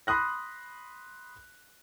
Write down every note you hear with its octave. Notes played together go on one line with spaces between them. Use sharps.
B5 C6 D#6 F#6 A#6